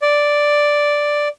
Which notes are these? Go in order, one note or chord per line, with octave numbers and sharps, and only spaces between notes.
D5